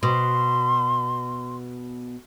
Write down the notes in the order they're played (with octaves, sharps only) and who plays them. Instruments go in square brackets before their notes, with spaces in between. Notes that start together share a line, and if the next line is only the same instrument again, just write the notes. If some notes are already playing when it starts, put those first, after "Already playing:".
[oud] B2 [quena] C6